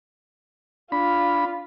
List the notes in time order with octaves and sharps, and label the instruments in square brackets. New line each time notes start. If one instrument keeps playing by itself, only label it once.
[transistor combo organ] D4 B5 [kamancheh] F4